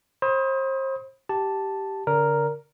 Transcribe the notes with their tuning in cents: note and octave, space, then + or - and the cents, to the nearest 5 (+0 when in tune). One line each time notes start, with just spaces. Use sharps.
C5 +35 B5 +10 D#6 +25
G4 -10 A5 +0
D3 -40 A#4 +0 D5 -35